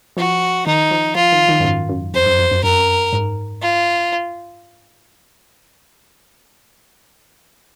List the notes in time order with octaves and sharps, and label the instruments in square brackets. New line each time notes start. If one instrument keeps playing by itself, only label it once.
[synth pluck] F3 [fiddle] F#4
[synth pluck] D#3 [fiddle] D#4
[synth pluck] F3
[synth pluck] F3 [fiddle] F4
[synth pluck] D#3
D#3
F#2
G#2
F#2
[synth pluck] F2 [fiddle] C5
[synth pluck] F#2
F2
F#2
[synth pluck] F#2 [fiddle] A#4
[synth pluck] G#2
[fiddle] F4